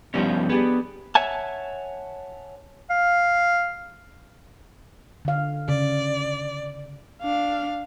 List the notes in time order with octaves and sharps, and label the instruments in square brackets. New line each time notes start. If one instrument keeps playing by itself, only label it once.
[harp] G2 D#4 G6 [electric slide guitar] F3 B3 C#4
[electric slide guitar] B3 [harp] D4 G4 G#4
[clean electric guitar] C#5 E5 F#5 G#5 A5
[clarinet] F5
[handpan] D3 F5
[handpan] C#3 [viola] D5
[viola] D4 F5